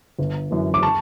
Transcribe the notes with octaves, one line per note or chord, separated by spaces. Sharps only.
G1
F#2 E3
D6
A5 C#6